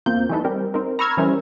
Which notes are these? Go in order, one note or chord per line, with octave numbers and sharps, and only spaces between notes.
E2 A#3 C4 F4 G6
E3 G3 A3 D#4 A4 B4
G3 C4 G4 A#4
C4 D#4 A#4
A#5 B5 C#6 E6 F6 G#6
E3 G3 C#4 E4 A#4 C5